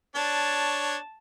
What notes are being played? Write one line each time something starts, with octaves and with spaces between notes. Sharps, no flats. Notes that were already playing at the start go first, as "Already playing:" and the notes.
D4 C#5 A5